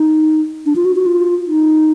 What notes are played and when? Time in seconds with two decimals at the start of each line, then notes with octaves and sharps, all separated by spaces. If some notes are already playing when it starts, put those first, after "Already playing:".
Already playing: D#4
0.66 D4
0.76 F4
0.85 F#4
0.96 F#4
1.06 F4
1.47 D#4